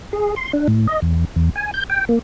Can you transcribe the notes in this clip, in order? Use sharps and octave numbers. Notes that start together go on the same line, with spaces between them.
G#4
C6
D4
A2
D#5
E2
E2
G#5
G6
G5
A#3